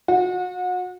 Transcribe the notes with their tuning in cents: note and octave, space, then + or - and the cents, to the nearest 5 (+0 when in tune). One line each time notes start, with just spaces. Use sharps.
F#4 -35